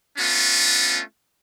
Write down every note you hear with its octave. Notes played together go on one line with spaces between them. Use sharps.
A3 B3 C#4 D4 F4